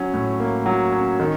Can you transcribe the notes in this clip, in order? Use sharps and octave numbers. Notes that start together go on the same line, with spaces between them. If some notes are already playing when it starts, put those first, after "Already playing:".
Already playing: F#3 C#4
A2
A#3
F#3
C#4
D#3